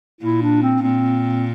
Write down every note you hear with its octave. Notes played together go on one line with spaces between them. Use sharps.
A#2 E4
D4
C4
A#2 C4